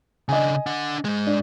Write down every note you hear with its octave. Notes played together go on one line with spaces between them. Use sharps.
C#3 D4 D#5 G#5
D4 F#5
G#2 G#3
D4